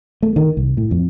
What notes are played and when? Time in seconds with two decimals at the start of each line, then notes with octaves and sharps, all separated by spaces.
0.23 A3
0.36 D#3
0.57 C2
0.77 A2
0.91 F2